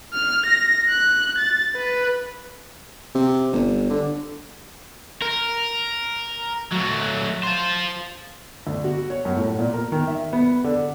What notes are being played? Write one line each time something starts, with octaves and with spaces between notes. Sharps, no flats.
F6
A#6
F#6
A6
B4
C3
G1
D3
A#4
F#3 A3
F4 C5
D2
F#4
C#5
F#2
A2
A#2
A#4
D#3
E5
B3
D3